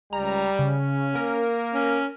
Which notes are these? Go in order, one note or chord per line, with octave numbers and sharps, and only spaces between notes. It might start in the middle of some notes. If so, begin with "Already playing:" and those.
C#2 G3 A#5
C#3 C#4
A#3 A#4
C#4